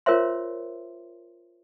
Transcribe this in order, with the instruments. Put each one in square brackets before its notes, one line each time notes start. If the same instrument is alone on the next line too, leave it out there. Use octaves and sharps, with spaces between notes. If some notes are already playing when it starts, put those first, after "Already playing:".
[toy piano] F4 A#4 C5 C#5 E5 C6